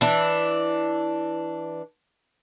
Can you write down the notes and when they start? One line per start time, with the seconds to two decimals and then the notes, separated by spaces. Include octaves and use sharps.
0.01 E3 D4